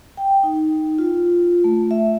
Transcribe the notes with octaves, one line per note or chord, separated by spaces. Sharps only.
G5
D#4
F4
A3
E5